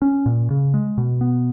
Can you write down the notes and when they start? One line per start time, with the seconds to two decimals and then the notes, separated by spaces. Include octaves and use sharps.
0.02 C#4
0.26 A#2
0.50 C#3
0.74 G#3
0.98 B2
1.21 B3